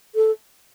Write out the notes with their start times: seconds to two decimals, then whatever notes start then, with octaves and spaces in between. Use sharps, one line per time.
0.15 A4